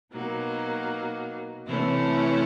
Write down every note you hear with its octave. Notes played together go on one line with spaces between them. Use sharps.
B2 F#3 A#3 D#4
C3 E3 A3 C#4 E4